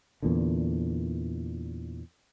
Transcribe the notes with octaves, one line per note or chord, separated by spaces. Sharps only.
E2 A#2 D3